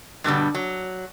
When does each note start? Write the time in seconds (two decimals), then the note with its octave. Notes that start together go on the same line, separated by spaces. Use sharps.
0.24 G2 B2 D3 G3
0.55 F#3